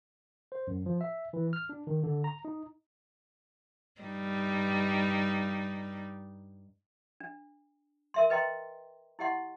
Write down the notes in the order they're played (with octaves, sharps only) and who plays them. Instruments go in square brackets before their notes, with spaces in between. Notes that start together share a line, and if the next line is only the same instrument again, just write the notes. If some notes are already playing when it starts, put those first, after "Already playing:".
[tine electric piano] C5
F#2
F3
E5
E3
F6
D4
D#3
D3
A#5
D#4
[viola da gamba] G2 G3 D#4
[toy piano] D4
A#4 E5 C6
B4 D#5 G5 A#5 C6
E4 G4 D#5 F#5 C6